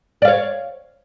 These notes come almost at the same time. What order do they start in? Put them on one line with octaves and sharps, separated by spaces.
D5 F5 C#5